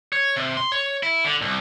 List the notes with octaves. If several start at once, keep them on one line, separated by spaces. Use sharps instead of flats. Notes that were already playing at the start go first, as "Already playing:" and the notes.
C#5
C3
C6
C#5
E4
D3
C2